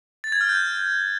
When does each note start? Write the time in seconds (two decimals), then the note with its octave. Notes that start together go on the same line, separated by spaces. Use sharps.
0.24 A6
0.32 G#6
0.41 F6
0.49 G6